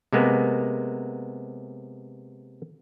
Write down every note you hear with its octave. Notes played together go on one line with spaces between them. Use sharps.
C3 G#3 A#3 B3